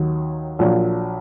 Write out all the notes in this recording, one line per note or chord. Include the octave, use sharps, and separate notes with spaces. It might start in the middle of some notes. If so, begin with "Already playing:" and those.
Already playing: D#2 D#3 F#3
A#1 A#2 F#3